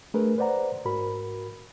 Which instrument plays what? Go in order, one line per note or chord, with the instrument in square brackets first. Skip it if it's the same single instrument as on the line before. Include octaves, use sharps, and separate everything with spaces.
[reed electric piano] A3 D4 G#4 A#4 B4
B4 C5 D5 F#5 A#5
G#2 F#4 A#4 B5